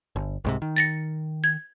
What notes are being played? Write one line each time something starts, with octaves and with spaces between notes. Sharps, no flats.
G1
C2 G#2 C3
D#3
A6 A#6 C#7
G#6